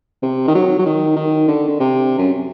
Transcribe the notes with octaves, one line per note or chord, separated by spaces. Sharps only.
C3
D#3
F#3
F#3
D#3
D#3
D3
D3
C3
F#2